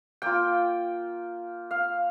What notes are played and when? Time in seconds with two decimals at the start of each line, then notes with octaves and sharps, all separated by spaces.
0.22 A#3 F4 G5
1.71 F5